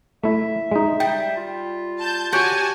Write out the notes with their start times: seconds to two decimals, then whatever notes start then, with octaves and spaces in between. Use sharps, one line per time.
0.24 A3 E4 E5
0.71 G#3 D#4
1.00 G3 G5
1.37 F4
1.98 A5 G6
2.32 F#4 G4 C#5 F#5 G#5 A5